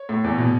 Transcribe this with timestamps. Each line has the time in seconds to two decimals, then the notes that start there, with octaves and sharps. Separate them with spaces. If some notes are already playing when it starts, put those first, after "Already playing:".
Already playing: C#5
0.09 A2
0.24 E2
0.38 B2